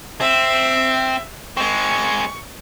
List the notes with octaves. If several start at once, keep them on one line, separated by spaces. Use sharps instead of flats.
C4 E5
G#3 C4 C#6